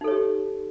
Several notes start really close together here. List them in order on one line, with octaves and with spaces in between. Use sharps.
D#4 A4 C#5 G4